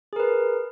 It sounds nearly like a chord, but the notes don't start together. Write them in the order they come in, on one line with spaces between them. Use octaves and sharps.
G#4 A#4 B4